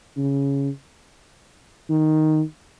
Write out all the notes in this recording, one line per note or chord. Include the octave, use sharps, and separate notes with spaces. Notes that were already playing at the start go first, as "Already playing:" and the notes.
C#3
D#3